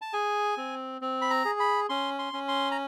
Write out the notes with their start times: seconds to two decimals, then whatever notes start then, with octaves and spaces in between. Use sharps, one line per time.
0.02 A5
0.13 G#4 G#5
0.57 C4
1.01 C4
1.21 B5
1.30 A#5
1.45 G#4
1.60 B5
1.89 C#4 C6
2.19 C6
2.33 C#4
2.48 C6
2.71 A#5